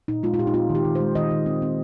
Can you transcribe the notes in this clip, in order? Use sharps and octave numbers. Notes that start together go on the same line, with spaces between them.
A#2 D#4
G#3 F4
F4
A#2 G4
D#4
C4 F4
D#3
G4
D#3
G#3 C5
D#3 D#5
D#3
C4
C4